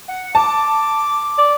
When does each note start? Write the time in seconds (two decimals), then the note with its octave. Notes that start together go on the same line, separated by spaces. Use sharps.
0.08 F#5
0.35 A5 D6
1.38 D5